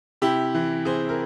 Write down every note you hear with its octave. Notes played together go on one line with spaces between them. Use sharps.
C3 E4 G4
E3
C3 G#4 C5
A#4